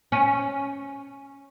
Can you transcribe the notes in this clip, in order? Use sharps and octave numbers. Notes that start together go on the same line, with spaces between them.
C#4